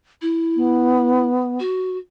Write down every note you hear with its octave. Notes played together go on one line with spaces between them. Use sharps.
E4
B3
F#4